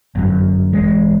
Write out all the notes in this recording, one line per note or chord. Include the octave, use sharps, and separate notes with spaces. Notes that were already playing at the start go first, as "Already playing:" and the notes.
G1 F#2
A1 G#3